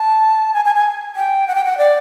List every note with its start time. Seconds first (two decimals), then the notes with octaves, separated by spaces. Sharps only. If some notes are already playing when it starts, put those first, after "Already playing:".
Already playing: A5
0.54 G#5
0.65 G#5
0.75 G#5
1.16 G5
1.48 F#5
1.55 G5
1.65 F#5
1.78 D5